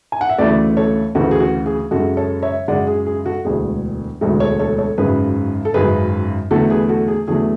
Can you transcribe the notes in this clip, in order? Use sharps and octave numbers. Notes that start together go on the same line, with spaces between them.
G#5
F#5
E5
D2 C#3 E3 A3 B4 D5
A4 C#5
D2 C#3 E3 A3 F#4
G#4
F#4
G#4
F#2 C#3 G#3 F#4 A4
A4 C#5
C#5 E5
F#2 C#3 G#3 D5 F#5
G#4
G#4
F#4 A4
E1 D2 D3 G#3 G#4
E1 D2 D3 G#3 F#4 A4
A4 C#5
A4 C#5
A4 C#5
G#1 F#2 C#3 G#4 B4
A4
G#1 F#2 C#3 G#4 B4
E2 D3 F#3 A3 F#4 A4
G#4 B4
F#4 A4
G#4
E2 D3 F#3 A3 G#4